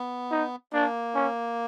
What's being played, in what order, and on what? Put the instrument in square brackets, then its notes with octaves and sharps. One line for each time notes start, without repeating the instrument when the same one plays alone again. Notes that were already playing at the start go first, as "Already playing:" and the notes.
Already playing: [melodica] B3
[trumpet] D#4
[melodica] A#3 [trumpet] D4
[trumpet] C#4